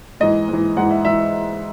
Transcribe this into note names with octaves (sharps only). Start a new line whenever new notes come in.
G#2 E3 D#5
G#2 E3
G#2 E3 F#5
E5
E3 E5